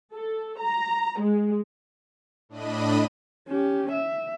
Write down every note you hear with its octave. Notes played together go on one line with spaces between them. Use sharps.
A4
A#5
G#3
A2 D4 D#5 B5 D#7
C#4 G4
E5